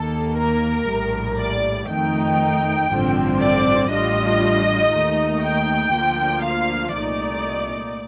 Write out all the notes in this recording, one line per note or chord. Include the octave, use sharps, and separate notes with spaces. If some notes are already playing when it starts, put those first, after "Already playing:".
Already playing: D#2 D#3 A#3 A4
A#4
A#1 A2 G3
D5
F2 D#3 A3 D#4 G5
A1 G2 D3 F3 C4
D5
A1 A2 G3 D4 F4 D#5
D#2 D#3 A3 D#4
G5
D2 D3 F3 A#3 F4
F5
C2 A#2 A3 D#4 D5